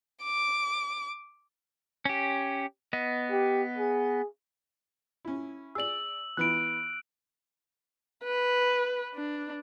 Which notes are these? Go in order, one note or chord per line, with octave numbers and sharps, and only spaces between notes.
D6
C#4 G4
B3 D#5
G4
G#4
C#4 E4
G#4 D5 E6 F#7
E3 B3 E4 F#6 D7
B4
D4